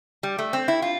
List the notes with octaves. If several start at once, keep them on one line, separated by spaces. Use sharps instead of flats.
G3
A3
C4
E4
F4